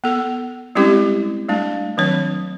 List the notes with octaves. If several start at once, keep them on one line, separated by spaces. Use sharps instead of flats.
B3 A4
G3 G#3 C4 C#4 E4 G4
G3 A3 D4
D#3 F#3 C4 D4 C#5